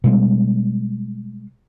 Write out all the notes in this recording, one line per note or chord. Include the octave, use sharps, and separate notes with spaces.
B2 G3 G#3